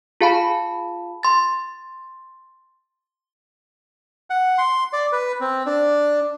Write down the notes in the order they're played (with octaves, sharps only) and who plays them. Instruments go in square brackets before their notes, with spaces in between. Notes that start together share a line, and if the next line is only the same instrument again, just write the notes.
[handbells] F4 G#4 F5 A5 B5
C6 A6
[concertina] F#5
C6
D5
B4
C4
D4